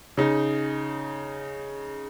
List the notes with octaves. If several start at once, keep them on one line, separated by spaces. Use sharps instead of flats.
C#3 D#4